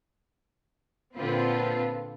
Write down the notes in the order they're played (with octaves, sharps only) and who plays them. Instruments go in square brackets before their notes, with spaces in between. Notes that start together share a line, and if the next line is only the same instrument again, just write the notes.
[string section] A#2 D3 C4 F4 B4